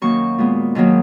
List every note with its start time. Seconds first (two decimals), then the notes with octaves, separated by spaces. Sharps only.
0.01 F#2 D#3 A#3 C#6
0.38 A#2 G#3 B3
0.75 G#2 D#3 F#3 A#3